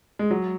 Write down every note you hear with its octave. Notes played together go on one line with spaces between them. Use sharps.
G#3
F#3